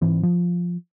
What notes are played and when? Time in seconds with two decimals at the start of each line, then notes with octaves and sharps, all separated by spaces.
0.02 G#2 E3 C4
0.23 F3